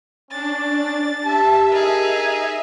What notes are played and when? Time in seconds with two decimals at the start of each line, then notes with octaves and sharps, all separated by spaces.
0.31 C#4 D4 A6
1.25 G4 E5 A5
1.71 D#4 G#4 A#4